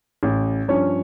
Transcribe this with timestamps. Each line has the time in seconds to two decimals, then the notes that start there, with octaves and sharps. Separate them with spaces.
0.23 A1
0.68 G2 F3 C#4 C#5